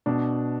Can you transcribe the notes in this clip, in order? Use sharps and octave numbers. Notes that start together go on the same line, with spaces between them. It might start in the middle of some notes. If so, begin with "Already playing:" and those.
B2 D4